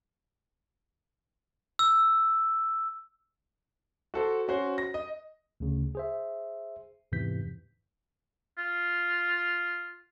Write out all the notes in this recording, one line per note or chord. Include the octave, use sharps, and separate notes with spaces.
E6
F#4 A4 C5
C#4 F#4 C5
A#6
D#5
D2 C#3
G#4 C5 E5
E2 G#2 C3 E3 G6 B6
F4